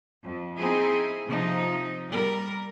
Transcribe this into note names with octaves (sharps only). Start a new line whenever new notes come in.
F2
C4 D#4 E4 G#4
C3 F3 D#4
G3 A#4